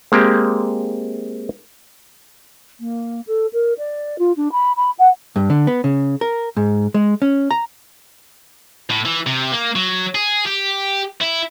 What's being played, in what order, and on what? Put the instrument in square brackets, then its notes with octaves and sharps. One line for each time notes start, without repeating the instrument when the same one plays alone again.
[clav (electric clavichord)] G#3 A#3 C4 G4
[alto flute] A#3
A4
A#4
D5
F4
D4
B5
B5
F#5
[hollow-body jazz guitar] G2
D3
B3
C#3
A#4
G#2
G#3
C#4
A#5
[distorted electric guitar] A2
E3
C3
A#3
F#3
G#4
G4
E4